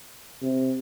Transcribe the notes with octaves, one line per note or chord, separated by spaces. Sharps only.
C3